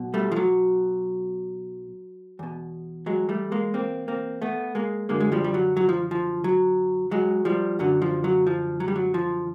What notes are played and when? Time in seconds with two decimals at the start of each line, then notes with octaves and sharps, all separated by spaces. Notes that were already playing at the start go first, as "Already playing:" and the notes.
Already playing: B1 B2
0.14 G3 A3
0.32 F3
0.36 F#3
2.39 E2 B2
3.06 F#3 G#3
3.29 G3 A3
3.52 G#3 A#3
3.74 A#3 C4
4.08 A#3 C4
4.42 A3 B3
4.75 G#3 A#3
5.09 F#2 D3 G#3 A#3
5.20 G#3
5.32 F3 G3
5.44 G3
5.54 F#3
5.77 F#3
5.89 F3
6.11 F3
6.44 F#3
7.11 F#3 G#3
7.45 F3 G3
7.79 F#2 D3 F#3
8.02 F3
8.24 F#3
8.47 F3
8.80 F#3
8.88 G3
8.96 F#3
9.14 F3